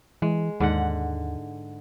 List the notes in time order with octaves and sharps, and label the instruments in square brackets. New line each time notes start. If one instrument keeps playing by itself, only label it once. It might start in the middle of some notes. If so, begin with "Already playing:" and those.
[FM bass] E3 [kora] G#3
[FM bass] D#2 [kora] G#2 D3 F#5